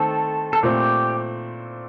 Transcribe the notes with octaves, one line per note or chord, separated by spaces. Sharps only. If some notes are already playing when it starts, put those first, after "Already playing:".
Already playing: D#3 A3 C4 A4
A4
A#2 A3 C4 G4